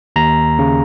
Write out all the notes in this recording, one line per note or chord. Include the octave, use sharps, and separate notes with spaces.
D#2 A#5
C#3